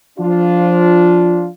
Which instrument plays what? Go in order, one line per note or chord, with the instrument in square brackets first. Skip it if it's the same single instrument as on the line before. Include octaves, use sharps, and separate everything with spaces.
[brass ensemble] F3 D4 F4